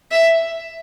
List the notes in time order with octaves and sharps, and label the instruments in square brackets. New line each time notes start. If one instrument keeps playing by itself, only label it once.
[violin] E5